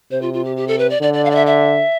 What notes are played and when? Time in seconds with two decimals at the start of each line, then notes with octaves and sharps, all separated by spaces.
0.11 C3 C5
0.22 F4
0.33 F4
0.44 G4
0.56 G4
0.68 A4
0.79 B4
0.90 D5
1.01 D3 D5
1.13 D5
1.25 F5
1.31 D5
1.35 E5
1.46 E5